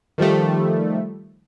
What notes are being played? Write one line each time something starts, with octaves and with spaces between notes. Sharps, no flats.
D#3 F3 G3 A3